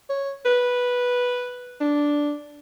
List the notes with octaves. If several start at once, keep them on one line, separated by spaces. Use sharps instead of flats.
C#5
B4
D4